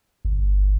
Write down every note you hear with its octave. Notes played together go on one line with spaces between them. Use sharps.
G1